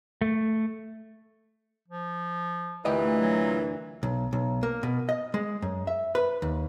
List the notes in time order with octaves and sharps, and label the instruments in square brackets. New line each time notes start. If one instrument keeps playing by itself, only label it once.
[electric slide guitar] A3
[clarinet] F3
[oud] D2 G4 D#5 [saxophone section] A#2 E3
[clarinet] F#3
[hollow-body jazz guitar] B1
B1
A#3
B2
D#5
G#3
F#2
E5
B4
D#2